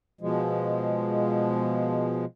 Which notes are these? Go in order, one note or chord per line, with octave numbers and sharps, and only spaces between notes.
B2 F3 G#3